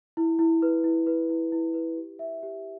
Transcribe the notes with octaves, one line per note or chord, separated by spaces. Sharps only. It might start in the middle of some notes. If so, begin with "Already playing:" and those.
E4
E4
B4
E4
B4
E4
E4
B4
G4
E5
G4